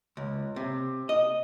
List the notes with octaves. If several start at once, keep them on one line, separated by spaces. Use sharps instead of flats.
C#2
C3
D#5